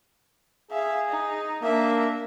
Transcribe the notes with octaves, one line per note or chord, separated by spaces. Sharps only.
G#4 E5 F5
D#4
A#3 D4 E5